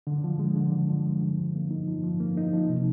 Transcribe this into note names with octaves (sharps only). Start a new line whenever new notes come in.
D3
F3
G#3
D3
D3
F3
G#3
D3
F3
A#3
D#4
F3
F3
A#3
D#4
F3
C3